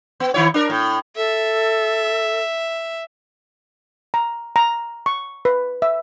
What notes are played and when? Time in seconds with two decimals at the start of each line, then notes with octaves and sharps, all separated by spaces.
0.20 B3
0.34 D#3 E4 C#5
0.54 D4 A#4
0.70 A2
1.16 A4 E5
4.14 A#5
4.56 A#5
5.06 C#6
5.45 B4
5.82 E5